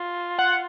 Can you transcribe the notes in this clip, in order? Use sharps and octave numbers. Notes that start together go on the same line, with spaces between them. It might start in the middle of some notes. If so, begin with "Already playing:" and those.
Already playing: F4
F#5